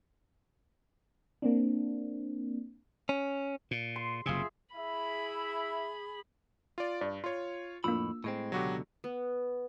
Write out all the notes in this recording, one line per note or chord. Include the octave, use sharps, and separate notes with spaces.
A#3 C4 D4
C#4
A#2
C6
F#1 C3 F4 G#4 E5
E4 G#4 E5 B5
F4 D5
G2 D5
F4 C#5 C6
F2 A2 A#3 D4 F4 B5 E6
A2 G#3 C4
C#2 B2 D3 F#3 F#4 G4
B3